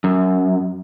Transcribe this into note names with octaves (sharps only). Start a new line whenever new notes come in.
F#2